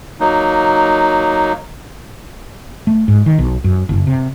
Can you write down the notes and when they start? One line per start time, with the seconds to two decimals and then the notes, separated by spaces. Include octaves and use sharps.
0.20 F#3 A#3 D#4
2.87 A3
3.08 G#2
3.26 D#3
3.39 B1
3.64 F#2
3.89 F#1
4.07 C3